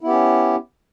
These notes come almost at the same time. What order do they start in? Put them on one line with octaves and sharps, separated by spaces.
E4 B3 G4 C#4